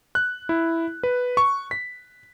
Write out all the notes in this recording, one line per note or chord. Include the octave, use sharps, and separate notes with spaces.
F#6
E4
B4
C#6
B6